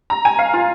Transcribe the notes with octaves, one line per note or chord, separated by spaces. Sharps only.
A#5
G#5
F5
F4